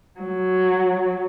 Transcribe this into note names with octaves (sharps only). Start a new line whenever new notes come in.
F#3